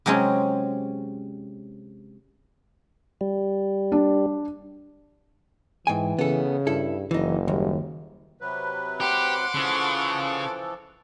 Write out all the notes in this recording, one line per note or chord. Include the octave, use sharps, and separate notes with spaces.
C3 F#3 G#3 C4 C#4
G3
D4
G#2 E3 G5 G#5
C#3 B3 A4
G2 E4 A4
F#1 E3 D#4
D#2 G3
C3 F#3 B4
G4 F#5 C6 D6
C#3 E3 F3 A4